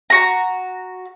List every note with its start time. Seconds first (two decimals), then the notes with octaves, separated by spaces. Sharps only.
0.10 F#4 A#5